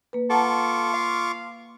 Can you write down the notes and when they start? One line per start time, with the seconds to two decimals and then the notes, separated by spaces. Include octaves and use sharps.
0.13 A#3 B4
0.30 F4 A4 F#5 A5 A#5 C#6 D6
0.94 F5